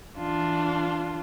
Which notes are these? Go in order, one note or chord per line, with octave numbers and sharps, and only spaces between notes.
E3 D4 F4